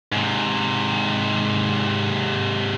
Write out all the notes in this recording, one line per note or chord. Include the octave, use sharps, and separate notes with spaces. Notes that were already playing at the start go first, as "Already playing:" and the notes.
G#2 C3